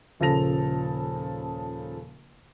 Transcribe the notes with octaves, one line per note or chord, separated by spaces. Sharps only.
D#1 C#3 F3 A4 A#6 F7